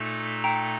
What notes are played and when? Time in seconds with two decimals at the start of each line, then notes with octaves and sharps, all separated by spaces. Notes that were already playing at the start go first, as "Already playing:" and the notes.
Already playing: A#2 A3 D#4 A4
0.44 G5 A#5